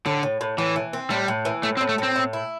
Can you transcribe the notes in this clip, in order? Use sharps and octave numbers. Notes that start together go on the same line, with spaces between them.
A2 D3
A2
A2
A2 E3
E3
C4
A2 G3
A2
E3
A2 A3
C4
A2
A3
A2 C4
A2
E4